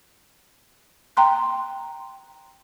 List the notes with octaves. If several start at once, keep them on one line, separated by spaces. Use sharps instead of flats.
G5 A#5 C6 F#6